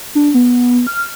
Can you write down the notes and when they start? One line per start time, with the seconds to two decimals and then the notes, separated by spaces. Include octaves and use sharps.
0.15 D4
0.34 B3
0.87 F6